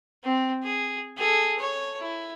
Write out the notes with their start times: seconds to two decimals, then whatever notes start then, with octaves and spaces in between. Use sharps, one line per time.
0.24 C4
0.63 G#4
1.17 G#4 A4
1.59 C#5
1.99 E4